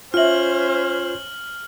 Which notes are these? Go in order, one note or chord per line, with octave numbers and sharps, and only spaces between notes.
C#4 F4 C5 E5 G5 F6 F#7